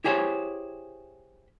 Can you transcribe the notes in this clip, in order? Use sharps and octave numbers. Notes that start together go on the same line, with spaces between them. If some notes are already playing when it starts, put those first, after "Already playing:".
E4 G4 G#4 C5 C#5